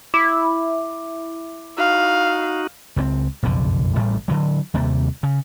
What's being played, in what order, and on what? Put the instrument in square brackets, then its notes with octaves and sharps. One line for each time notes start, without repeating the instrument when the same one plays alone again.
[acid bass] E4 [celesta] D6
[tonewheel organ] D#4 F#4 [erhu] F5
[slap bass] C#2 A3 C4
F#1 B1 F2 D3
A1 A2 G3 A3
D3 E3 F#3
D#2 C3 G3 A#3
C#3